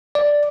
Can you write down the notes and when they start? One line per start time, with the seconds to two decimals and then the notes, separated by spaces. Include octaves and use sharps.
0.15 D5